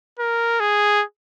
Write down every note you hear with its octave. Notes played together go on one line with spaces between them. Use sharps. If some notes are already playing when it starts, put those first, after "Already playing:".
A#4
G#4